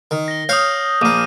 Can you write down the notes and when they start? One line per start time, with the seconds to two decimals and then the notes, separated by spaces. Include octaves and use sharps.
0.11 D#3
0.28 A#6 G7
0.49 C#5 F5 D#6 F6 G6
1.01 A#1 A#3 D6 D#7